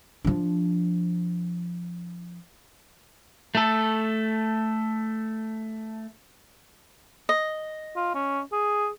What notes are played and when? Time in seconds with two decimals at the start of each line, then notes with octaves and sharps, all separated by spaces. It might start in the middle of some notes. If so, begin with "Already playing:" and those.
0.25 F3 D4
3.55 A3 A4
7.29 D#5
7.96 F4
8.15 C#4
8.52 G#4